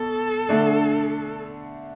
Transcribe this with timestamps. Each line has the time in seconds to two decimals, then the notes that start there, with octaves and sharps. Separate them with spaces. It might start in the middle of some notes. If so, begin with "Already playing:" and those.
Already playing: B2 A4
0.49 D3 A3 D4